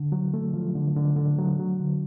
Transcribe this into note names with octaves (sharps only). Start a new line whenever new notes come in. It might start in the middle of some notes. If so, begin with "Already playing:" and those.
Already playing: D3
F#3
A3
F3
D3
D3
D3
F#3
F#3
D3